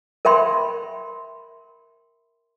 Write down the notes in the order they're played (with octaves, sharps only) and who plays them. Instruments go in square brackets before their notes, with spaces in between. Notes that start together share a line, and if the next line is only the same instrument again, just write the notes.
[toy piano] A#4 E5 G5 B5 C6